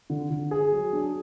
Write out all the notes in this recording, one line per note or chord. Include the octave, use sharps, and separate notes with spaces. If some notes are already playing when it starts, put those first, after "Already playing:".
D3
D3
G#4
F#3
D4